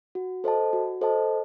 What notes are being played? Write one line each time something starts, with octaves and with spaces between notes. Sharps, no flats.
F#4
A4 C5 D#5 A5
F#4
A4 C5 D#5 A5